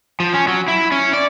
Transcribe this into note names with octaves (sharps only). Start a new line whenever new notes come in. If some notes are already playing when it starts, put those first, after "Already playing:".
F3
C#4
F#3
E4
C#4
D5